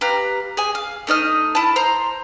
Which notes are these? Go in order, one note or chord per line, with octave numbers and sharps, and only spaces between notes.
G4 B4 F5 A#5
G#4 G#5
F5
A3 D#4 D#5 F6
E4 A5
C5 A#5 C6